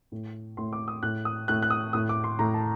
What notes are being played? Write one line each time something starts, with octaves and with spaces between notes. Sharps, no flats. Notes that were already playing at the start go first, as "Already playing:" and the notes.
A2
A2 C6
D6
D#6
A2 F#6
D#6
A2 F#6
F#6
D#6
A2 D#6
D6
C6
A2 A#5
A5